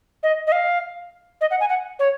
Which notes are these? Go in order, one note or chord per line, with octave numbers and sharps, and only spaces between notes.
D#5
D#5
F5
D#5
F#5
G#5
F#5
C#5